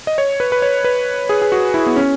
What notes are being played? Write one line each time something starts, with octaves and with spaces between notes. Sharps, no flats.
D#5
C#5
B4
B4
C#5
B4
G#4
G#4
F#4
E4
B3
C#4